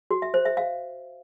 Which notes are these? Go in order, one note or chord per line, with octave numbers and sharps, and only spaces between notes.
F#4
E5
C5
E5
F5